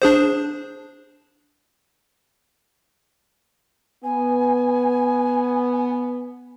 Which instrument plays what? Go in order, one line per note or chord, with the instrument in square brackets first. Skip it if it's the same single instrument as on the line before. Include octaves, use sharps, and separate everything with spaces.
[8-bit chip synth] D4 G#4 C5
[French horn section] B3 [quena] G#5